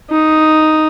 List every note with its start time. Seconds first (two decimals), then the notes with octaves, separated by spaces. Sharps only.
0.10 D#4